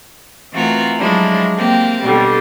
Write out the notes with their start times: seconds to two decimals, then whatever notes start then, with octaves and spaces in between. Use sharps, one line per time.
0.54 E3 A3 C4 F4 F#4 A#4
0.98 F3 F#3 G#3 D4 E4
1.56 A#3 C4 G4
2.03 B2 D3 G3